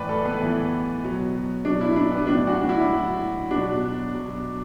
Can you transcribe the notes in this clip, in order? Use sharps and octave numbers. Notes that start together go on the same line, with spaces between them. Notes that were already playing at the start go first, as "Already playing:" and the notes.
Already playing: A2 E3 B4 D5
A4
B3
A2 E3
B2 F#3
B2 F#3 D4
E4
D4
B3
A2 F#3 D4
F#4
D4
E4
A2 F#3
B2 F#3 D4
B2 F#3